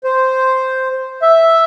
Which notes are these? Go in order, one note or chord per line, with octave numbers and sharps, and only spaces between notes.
C5
E5